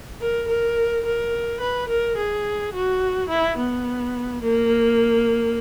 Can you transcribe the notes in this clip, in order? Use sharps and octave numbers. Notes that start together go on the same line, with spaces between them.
A#4
A#4
A#4
B4
A#4
G#4
F#4
E4
B3
A#3